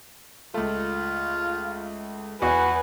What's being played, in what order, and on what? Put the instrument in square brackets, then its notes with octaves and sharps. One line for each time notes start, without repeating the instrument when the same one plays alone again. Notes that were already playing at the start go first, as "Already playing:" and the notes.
[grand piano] C#2 A3 [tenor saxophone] F4
[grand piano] E2 [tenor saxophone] F#4 [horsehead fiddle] B4 G#5